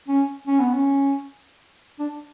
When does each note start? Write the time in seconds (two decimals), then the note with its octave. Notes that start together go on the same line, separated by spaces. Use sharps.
0.08 C#4
0.47 C#4
0.60 B3
0.74 C#4
1.99 D4